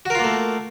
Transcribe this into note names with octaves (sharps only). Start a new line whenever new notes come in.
A3 A#3 F4 F#4 A#4